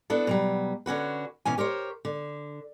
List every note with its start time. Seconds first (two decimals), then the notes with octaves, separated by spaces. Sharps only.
0.10 B3 D4 E4 A4
0.27 B2 F#3 G3
0.86 D3 C#4 F#4 B4
1.45 B2 E3 C#4 G#5
1.58 G4 A#4 C5 C#5
2.05 D3